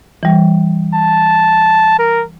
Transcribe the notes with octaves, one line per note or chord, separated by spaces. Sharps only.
E3 G3
A5
A#4